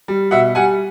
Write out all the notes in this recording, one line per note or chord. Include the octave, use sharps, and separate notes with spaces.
G3
B2 E5 F#5
G3 F#5 G#5